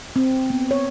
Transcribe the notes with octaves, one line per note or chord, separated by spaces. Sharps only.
C4
B3
C#5